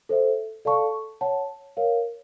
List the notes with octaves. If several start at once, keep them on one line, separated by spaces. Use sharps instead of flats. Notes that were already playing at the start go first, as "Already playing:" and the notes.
A4 C5 E5
A4 D5 F5 A5 C#6
C#5 F#5 A5
A#4 C#5 F5